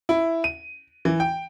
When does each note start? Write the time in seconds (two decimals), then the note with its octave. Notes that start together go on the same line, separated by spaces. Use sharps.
0.09 E4
0.44 D#7
1.05 E3
1.20 G5